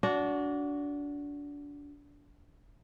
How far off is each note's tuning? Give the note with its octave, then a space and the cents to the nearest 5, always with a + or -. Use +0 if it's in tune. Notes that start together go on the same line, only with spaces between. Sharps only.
D4 -25 F#4 +0